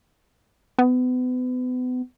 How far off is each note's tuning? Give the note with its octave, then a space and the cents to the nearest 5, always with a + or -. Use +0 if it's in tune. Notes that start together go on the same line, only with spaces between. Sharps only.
B3 +35